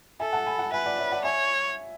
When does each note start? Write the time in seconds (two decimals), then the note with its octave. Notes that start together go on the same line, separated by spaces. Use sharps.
0.20 A4 E5 G#5
0.33 F#5 A5
0.47 G#5 B5
0.59 F#5 A5
0.72 B4 E5 G#5
0.86 D5 F#5
0.98 C#5 E5
1.12 D5 F#5
1.24 C#5 E5 G#5